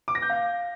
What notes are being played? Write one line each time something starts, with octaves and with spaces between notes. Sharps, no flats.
D6
A#6
G6
F5